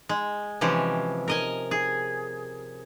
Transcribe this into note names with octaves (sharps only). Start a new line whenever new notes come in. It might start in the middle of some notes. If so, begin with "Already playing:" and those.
G#3
C3 E3 F3 G#3 C#4 G4
A#4 D#5 G#5
G#4